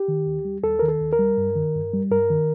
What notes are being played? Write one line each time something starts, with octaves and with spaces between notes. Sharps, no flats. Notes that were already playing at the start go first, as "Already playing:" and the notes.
Already playing: G4
D#3
D#2
G3
D#2 A4
D#3 A#4
A4
D#2
A#4
G3
G2
D#3
G2
G3
G2 A#4
D#3